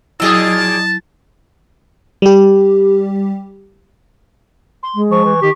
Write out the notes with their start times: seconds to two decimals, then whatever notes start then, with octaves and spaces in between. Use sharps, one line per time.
0.20 A#2 F3 F#3 E4 G#4 D#5 A5 E6
2.22 G3 G4
4.83 C6
4.95 G#3
5.11 F3 C#6
5.25 E3
5.42 D#3 G4